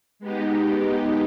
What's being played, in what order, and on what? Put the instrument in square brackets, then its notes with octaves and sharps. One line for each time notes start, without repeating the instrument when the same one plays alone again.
[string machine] G#3 B3 D#4 G4